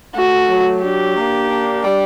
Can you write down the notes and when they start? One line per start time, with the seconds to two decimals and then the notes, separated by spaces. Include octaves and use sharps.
0.15 A3 F#4
0.49 F#3
0.82 D4 G4
1.17 A#3
1.50 D4
1.84 G3